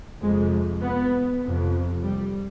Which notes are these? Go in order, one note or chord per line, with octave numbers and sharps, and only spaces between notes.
F2 C3 G#3
B3
F2 C3
G3